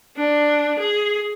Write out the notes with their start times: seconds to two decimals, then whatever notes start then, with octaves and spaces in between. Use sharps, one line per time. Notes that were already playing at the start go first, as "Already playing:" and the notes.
0.17 D4
0.78 G#4